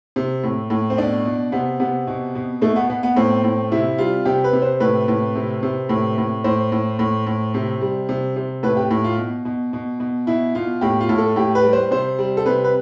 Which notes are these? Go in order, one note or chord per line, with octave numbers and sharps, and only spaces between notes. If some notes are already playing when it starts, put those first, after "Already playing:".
C3
A2
A2
C4
B2 D4
B2
C3 B3
C3 B3
B2
B2
B2 A3
B3
B2 B3
B3
A2 C4
A2
C3 E4
G3 F4
C3 G4
B4
C3
C5
A2 B4
A2
C3
C3
A2
A2
A2 C5
A2
A2
A2
C3
G3
C3
C3
A2 B4
G4
A2
F4
B2
B2
B2
B2
B2 E4
B2 F4
A2 G4
F4
A2
A4
A2 G4
B4
G3
C5
C3 C5
G3
A4
C3 B4
B4